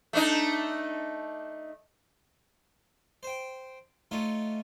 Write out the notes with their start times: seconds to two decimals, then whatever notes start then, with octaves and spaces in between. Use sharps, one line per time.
0.13 A3 D4 D#4
3.23 C5 G5
4.11 A3 D#4 F4 C#5